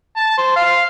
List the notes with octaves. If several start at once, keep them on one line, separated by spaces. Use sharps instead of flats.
A5
C5
F5